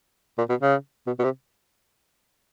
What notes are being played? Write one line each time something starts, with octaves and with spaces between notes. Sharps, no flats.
A#2
B2
C#3
B2
B2
C3